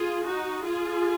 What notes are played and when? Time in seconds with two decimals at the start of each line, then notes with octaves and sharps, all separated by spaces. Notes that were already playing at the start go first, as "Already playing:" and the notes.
Already playing: F4 G#4
0.26 D#4 F#4
0.64 F4 G#4